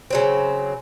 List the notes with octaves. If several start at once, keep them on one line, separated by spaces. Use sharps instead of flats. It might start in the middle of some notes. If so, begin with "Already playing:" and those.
C#3 F#3 C4